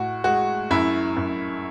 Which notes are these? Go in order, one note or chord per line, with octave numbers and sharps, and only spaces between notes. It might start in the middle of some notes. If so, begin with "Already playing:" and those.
Already playing: A2 F#4
G#3 F#4
F#2 E4
F#2